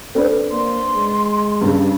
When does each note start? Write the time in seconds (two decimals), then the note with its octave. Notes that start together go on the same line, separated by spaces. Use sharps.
0.15 C4 D4 A4 B4
0.51 A#3 C6
0.94 G#3
1.61 G2 C#3